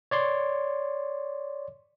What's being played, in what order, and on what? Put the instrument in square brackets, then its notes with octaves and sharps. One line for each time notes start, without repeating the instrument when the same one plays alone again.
[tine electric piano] C#5 D5 C6